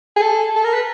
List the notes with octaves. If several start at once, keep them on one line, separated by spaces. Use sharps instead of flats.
G#4
A4
A4
A#4
B4